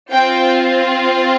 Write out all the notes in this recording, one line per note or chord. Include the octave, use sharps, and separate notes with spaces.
C4 F4 G5